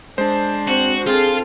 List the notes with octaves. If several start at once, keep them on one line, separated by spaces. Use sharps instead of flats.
G#3 D4 C5
C4 F#4
C4 F4 G#4 A4